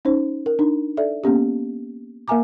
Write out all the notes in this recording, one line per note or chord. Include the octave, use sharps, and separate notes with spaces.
C#4 D#4 C5
A#4
D4 D#4
A4 D5 E5
A#3 B3 C#4 G4
A#3 A#4 E5 G#5 A#5 D6